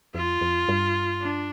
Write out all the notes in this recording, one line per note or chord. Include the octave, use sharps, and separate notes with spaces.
F2 F4
F2
G2
D4